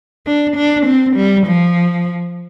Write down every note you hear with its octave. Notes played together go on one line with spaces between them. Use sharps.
D4
D4
C4
G3
F3